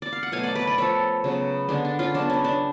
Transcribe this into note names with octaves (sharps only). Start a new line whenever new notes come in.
D5
F5
F#5
B2 F#3 A3 F5 G#5
D5 F#5
B4 D5
B4 D5
F3 A3 A4 C#5
C#3 F#3 B3
D3 G#3 B3 D4
D4
C#4 F4
C#3 F#3 B3 D4
C#4
D4